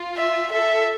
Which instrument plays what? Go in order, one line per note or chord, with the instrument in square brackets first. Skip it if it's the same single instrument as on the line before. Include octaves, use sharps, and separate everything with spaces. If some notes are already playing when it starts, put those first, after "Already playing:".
Already playing: [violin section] F4
[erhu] E5
[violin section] A4 [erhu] E5